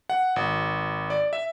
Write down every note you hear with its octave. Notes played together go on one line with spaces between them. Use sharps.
F#5
G#1
D5
E5